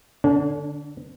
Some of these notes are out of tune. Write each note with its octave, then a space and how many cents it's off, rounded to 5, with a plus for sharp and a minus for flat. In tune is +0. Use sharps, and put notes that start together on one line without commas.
D3 +10 D4 -40